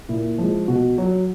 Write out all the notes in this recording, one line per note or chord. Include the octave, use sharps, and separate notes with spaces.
A#2 E4
F3 G#3
B2 F#4
F#3